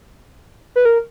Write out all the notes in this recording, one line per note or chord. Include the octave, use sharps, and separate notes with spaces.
B4
A#4